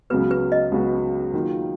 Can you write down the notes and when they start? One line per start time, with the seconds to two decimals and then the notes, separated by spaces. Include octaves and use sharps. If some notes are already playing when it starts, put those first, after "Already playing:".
0.10 C#2 C#3 F#3 B3 F#4 B4
0.31 B4
0.52 D#5
0.72 C#2 C#3 F#3 B3 F#4
1.33 D#3 F#3 A#3 F4